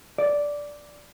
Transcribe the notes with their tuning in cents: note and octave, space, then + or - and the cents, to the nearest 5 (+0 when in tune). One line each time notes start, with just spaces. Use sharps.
D5 -5